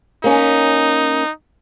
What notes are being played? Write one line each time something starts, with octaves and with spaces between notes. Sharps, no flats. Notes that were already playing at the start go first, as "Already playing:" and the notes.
A#3 C#4 D#4